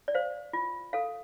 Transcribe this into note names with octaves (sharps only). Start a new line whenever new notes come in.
D5
C5 F5
F4
A4 F5